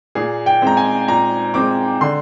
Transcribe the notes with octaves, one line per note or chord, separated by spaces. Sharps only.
A#2 G#4
G5
G#3 C4 A#5
G#5
A#2 A#5
G#3 C4 D6
D3 C6